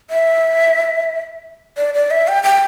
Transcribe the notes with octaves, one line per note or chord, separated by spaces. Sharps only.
E5
D5
D5
E5
G5
G5